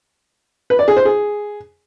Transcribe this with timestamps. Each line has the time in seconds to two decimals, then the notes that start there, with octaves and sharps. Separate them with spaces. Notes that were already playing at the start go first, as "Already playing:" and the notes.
0.70 B4
0.79 D5
0.88 G#4
0.97 C5
1.05 G#4